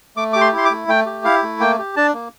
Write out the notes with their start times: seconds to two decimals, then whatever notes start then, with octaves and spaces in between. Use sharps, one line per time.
0.16 A3 D6
0.33 G4 D6
0.41 C6
0.53 E4
0.58 C6
0.65 D6
0.71 A3
0.88 A3 G5
1.06 G4
1.25 E4 F5
1.43 A3
1.60 A#3 G5
1.78 G4
1.96 D4 A5
2.14 A#3